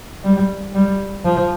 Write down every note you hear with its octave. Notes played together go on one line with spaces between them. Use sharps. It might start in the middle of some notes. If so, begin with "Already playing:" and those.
G3
G3
F3